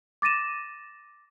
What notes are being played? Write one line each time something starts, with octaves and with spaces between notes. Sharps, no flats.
D6 A6 A#6 D#7 E7